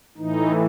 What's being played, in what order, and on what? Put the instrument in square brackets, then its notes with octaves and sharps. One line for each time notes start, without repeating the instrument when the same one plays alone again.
[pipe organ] A2 E3 D#4